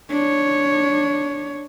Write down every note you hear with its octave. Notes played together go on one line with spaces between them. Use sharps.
D4 C#5